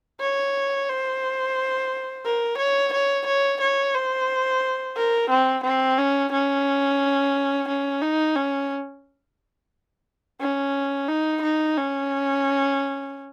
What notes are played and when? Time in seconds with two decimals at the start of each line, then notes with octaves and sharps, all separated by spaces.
0.20 C#5
0.89 C5
2.25 A#4
2.58 C#5
2.93 C#5
3.27 C#5
3.61 C#5
3.94 C5
4.96 A#4
5.30 C4
5.64 C4
5.98 C#4
6.33 C#4
7.69 C#4
8.02 D#4
8.36 C#4
10.41 C#4
11.08 D#4
11.42 D#4
11.77 C#4